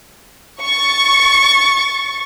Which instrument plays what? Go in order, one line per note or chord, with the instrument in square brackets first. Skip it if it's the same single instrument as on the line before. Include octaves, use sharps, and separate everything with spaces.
[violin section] C#6 A6